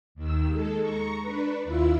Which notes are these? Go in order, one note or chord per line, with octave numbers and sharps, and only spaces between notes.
D#2 D#3 E6
G#3 A4
A#5 C#6 C#7
D4 B4
D#2 E4 F4 E6